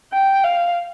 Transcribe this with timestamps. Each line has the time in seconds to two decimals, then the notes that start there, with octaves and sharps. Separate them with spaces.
0.13 G5
0.44 F5